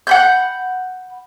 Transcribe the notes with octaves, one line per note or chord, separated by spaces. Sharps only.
F#5 B5 G6